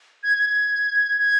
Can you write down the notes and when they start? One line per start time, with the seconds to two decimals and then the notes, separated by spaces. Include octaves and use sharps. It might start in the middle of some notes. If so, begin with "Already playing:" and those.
0.23 G#6
0.38 G#6
1.19 G#6